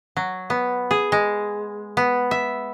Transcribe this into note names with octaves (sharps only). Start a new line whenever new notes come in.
F#3
B3
G#4
G#3
B3
E5